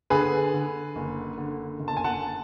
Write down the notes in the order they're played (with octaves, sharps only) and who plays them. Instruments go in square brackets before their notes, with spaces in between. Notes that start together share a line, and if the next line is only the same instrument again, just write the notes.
[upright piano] D3 G#4 B4
D3
F#1
D3
F#1
A5
G#5
F#5 A5